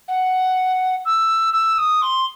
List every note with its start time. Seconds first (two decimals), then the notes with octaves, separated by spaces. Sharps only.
0.08 F#5
1.05 E6
1.53 E6
1.78 D#6
2.02 C6